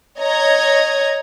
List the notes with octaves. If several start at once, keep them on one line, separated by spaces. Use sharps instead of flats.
C#5 D#5 A#5 G#6